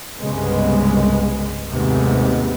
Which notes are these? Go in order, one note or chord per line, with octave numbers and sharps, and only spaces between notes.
C2 G2 C#3 G#3 B3
D#2 G#2 C3 G#3 A3 B3